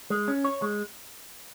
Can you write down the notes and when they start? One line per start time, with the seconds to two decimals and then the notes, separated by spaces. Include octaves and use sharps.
0.10 G#3
0.28 C#4
0.44 C#5
0.62 G#3